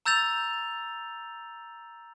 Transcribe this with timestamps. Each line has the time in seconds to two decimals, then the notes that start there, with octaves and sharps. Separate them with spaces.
0.06 A#5 E6 G6 A6 F7